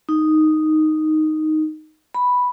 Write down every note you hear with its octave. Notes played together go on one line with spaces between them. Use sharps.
D#4
B5